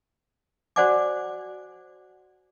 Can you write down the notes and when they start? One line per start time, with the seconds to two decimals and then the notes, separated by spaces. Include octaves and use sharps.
0.76 F#4 C5 D5 F#5 G#5 D6